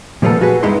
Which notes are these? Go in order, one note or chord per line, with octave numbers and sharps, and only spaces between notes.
A#2 F3 G3 A#3 B3 A4
F#4 G#4 B4
G2 G#3 B3 D#4 E4 C6